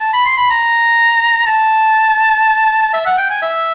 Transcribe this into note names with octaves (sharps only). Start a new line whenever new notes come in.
A5
B5
C6
B5
A#5
A5
E5
F#5
G5
G#5
E5